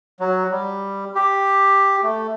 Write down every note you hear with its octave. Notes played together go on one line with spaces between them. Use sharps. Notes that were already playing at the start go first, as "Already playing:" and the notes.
F#3
G3
G4
A3